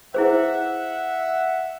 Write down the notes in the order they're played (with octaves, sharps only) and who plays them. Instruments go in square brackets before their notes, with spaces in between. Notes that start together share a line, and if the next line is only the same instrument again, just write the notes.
[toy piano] E4 G#4 C5 [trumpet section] E5 F#5